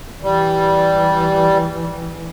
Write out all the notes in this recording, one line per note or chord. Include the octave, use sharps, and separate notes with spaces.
E3 G3